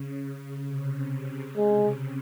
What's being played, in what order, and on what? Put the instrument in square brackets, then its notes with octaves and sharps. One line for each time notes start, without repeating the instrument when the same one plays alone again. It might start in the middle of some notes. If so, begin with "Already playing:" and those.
Already playing: [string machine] C#3
C3
C#3
[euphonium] G#3